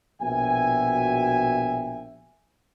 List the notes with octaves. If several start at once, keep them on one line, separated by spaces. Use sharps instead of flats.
A#1 B2 F#4 E5 G5 G#5